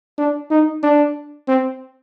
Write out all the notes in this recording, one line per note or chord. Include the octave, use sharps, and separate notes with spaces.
D4
D#4
D4
C4